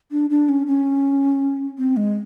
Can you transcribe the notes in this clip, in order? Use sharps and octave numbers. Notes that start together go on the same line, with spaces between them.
D4
D4
C#4
C#4
C4
G#3